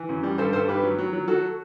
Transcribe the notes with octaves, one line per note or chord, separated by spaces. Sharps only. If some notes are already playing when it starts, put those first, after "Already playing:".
Already playing: E3
F#2
G3
G2 A4 C5
G2 A4 C5
G2 G4 B4
F#3
F#3
F#3
F#3 F#4 A4